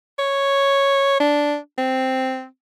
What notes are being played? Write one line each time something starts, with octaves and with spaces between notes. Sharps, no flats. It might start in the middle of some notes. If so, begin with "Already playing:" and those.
C#5
D4
C4